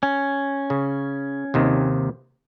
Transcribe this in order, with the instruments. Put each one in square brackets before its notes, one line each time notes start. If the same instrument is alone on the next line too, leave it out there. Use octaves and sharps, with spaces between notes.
[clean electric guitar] C#4
[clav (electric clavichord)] C#3
D#2 C3 D#3